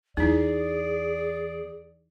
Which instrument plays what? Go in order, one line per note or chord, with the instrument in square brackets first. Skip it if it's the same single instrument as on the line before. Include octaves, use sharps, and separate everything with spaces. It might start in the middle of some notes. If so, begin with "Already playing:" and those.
[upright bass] E2 [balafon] D#4 E4 [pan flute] G#4 [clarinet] D5